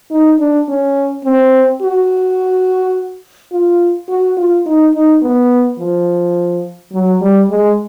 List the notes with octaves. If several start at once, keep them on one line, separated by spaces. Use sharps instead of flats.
D#4
D4
C#4
C4
F#4
F4
F#4
F4
D#4
D#4
B3
F3
F#3
G3
G#3